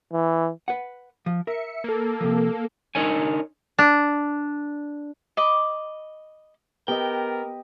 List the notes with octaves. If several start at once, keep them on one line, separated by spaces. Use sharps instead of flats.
E3
B4 F#5
F3
A#4 E5 C#7
A#3 A4
C3 F3
D4 D#4 A#4 C#5 G#5
D4
D#5 B5 D6
B3 G4 A#4 D#5 G5